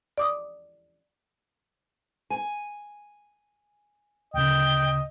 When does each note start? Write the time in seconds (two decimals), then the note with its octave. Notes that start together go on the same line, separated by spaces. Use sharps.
0.18 D5 D6 D#6
2.30 G#5
4.34 D2 A#2 C#3 D#5 G5